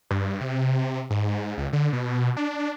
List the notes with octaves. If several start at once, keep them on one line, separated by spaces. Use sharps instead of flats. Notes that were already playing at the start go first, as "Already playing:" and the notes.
G2
C3
G#2
C#2
D3
B2
D4